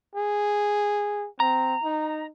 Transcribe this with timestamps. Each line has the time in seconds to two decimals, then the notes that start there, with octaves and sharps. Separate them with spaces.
0.15 G#4
1.40 C4 A#5
1.84 D#4